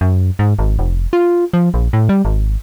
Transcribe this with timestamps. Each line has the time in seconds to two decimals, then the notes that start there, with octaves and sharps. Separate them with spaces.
0.01 F#2
0.39 G#2
0.59 G#1
0.79 F1
1.13 F4
1.53 F3
1.74 A#1
1.93 A2
2.09 G3
2.25 G#1